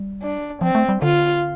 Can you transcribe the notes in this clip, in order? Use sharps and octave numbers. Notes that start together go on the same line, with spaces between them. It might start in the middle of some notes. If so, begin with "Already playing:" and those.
Already playing: G3
D4
F3 C4
A3
G3
D3 F4